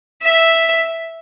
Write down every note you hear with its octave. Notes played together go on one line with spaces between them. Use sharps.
E5